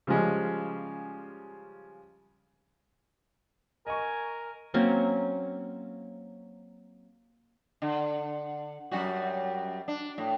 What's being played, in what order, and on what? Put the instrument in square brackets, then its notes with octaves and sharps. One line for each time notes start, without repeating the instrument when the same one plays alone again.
[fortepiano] C#3 F3 G3 G#3 C#4
[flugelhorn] A#4 [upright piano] D#5 C#6 [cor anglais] G#5
[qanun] F#3 A#3 C4 C#4
[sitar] D3
F#2 G3 F#4
D4
A2